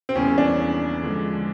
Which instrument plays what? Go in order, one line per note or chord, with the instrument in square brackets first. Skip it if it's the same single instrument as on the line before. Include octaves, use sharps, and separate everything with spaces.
[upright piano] C4
[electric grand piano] E2 C#3 E3 G3 A#3 [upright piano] C#4
[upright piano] D4
[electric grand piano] D3 F3 G#3